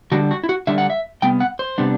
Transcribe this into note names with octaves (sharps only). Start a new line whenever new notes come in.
D3 G3 D4 F#4
F#4
E4
F#4
D3 G3 D4 E5
F#5
E5
C3 G3 B3 G5
F#5
C5
C3 G3 B3 D4